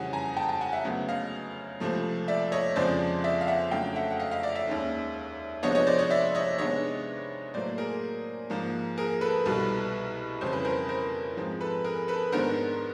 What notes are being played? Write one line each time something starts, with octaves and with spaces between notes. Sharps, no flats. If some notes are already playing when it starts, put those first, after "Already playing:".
Already playing: F2 C#3 E3 G3 F#5 G#5
G#5 A#5
G5 A5
G5 A5
F#5 G#5
E5 F#5
D2 C#3 F#3 B3
D#5 F5
C#2 C3 F3 A3
D5 E5
C#5 D#5
F2 C#3 F3 G#3 C4 C5 D5
D5 E5
F5
E5 F#5
F2 C#3 F#3 A3 D4 F5 G5
E5 F#5
F#5
D#5 F5
D#5 F5
D5 E5
D5 E5
D#2 D#3 G#3 C#4
C3 F3 G#3 B3 D4 C#5 D#5
C#5 D#5
C5 D5
C#5 D#5
D5 E5
C#5 D#5
C3 D#3 G#3 B3 D4 C#5 D#5
A2 F#3 A#3 C5 D5
G#4 A#4
G#2 F3 A#3
G#4 A#4
A4 B4
C2 B2 G3
F2 C#3 E3 G3 C4 C5
B4
A#4 C5
A#4 C5
G#2 F3 G#3 C4
A4 B4
G#4 A#4
A4 B4
G#2 D#3 G#3 B3 D4 A#4 C5